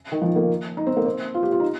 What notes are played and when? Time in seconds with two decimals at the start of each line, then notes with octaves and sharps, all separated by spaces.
0.12 D#3
0.21 F3
0.36 A#3
0.77 D#4
0.87 C4
0.97 A#3
1.06 C4
1.34 F4
1.43 G4
1.52 F4
1.60 D#4